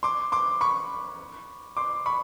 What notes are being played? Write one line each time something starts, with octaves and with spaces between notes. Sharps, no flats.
C6 D6
C6 D6
B5 C#6
C6 D6
B5 C#6